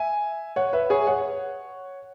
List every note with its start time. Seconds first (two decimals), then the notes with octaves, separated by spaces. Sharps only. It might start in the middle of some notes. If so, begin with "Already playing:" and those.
Already playing: E5 G#5
0.56 C#5 F#5
0.73 B4 E5
0.90 G#4 C#5
1.07 C#5 F#5